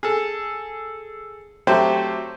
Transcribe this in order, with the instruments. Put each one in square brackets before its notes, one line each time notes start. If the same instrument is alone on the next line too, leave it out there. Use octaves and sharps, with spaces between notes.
[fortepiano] G#4 A4
F#3 A3 C4 G4 C5